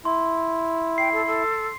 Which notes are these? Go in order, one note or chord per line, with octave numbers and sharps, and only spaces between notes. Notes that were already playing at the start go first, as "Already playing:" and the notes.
E4 C6
G5 C7
A4
A4